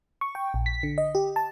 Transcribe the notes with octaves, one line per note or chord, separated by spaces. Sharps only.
C#6
G5
A#1
B6
D3
D#5
G4
A5